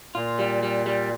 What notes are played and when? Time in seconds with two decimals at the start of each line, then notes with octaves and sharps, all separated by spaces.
0.15 A#2 F4
0.39 G3
0.63 G3
0.86 G3